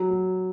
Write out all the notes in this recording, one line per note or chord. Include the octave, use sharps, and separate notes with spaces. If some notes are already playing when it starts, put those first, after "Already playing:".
Already playing: F#3
F#3